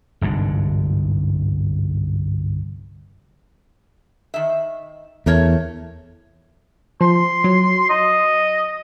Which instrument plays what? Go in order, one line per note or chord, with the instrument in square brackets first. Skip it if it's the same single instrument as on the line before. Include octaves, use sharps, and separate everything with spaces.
[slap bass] G1 C2 G#2 D3
[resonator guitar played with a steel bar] D#3 E5
[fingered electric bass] E2 [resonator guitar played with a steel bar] A3 A#4 C#5
[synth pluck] F3 [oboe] C6
[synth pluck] F#3
[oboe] D#5